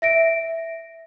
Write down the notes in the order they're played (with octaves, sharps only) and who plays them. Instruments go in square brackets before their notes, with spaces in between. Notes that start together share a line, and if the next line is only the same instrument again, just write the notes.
[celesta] E5 A#6 D7